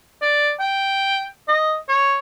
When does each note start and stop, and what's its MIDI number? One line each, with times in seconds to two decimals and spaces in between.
0.22 0.51 74
0.60 1.27 79
1.48 1.76 75
1.88 2.18 73